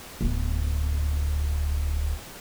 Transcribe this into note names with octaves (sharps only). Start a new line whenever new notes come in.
D1 B3